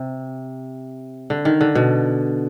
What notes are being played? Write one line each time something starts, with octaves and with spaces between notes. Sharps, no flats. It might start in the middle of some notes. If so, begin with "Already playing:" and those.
Already playing: C3
D3
D#3
D3
B2